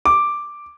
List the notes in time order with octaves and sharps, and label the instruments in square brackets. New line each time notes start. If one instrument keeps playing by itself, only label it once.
[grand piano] D6